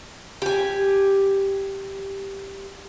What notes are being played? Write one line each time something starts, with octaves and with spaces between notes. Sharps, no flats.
G4 G#5